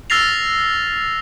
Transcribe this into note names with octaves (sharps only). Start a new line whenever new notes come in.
E6 F6 A6 A#6 C7 F7